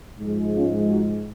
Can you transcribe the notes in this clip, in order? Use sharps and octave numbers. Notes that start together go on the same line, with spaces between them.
G#2 F3 G#3
C#4 F4
D#4 F#4